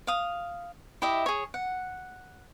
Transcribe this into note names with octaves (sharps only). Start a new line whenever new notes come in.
F5 D#6
E4 G4 D#5 E5
G#4 C#5
F#5